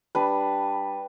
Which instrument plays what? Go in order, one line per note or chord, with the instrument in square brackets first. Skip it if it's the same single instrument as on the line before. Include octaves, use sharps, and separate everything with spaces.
[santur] G3 D4 B4